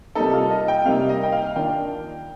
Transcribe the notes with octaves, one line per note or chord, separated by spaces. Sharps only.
C3 G3 A#3 D#4 A4
F4
D#5
G5
C3 G3 A#3 D#4 F5
D#5
G5
F5
D#3 A#3 D4 F4 G5